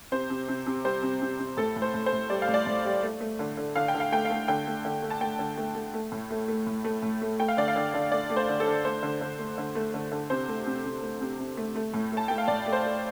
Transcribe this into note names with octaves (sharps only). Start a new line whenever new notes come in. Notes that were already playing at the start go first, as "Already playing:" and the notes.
C3 C5
C3
C3
C3
G3 C5
C3
C3
C3
A2 A4
A2
C5
A2
C5
A2
G3 D5
F5
A2
D5
A2
G3
A3
A3
D3
D3
D3 F5
G5
D3
F5
A3 G5
F5
A3
D3 G5
A3
D3
A3
A5
A3 G5
D3
A3
A3
A3
A2
A3
A3
A2
A3
A2
A3
A3 G5
F5
D3 D5
F5
D3
D3
A3 D5
A3
C5
D3
A4
D3
A3 C5
D3
D3
A3
D3
A3
D3
D3
C3 C5
A3
C3
C3
A3
C3
C3
A3
A3
A2
A3
A5
A3 G5
F5
A2 D5
A3
C5
A3